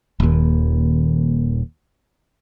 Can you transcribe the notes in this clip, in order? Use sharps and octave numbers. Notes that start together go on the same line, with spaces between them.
D#1 D#2